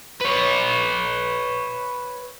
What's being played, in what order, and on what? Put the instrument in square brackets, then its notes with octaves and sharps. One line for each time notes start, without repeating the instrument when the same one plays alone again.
[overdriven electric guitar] B4 C#5